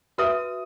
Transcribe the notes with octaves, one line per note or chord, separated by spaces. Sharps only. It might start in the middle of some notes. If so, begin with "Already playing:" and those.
F#4 B4 E5 D#6